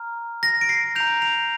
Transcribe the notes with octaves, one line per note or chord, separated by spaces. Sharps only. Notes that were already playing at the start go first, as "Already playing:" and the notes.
Already playing: A#5 F6
A#6
D7
C7
A#5 G6 F7
F7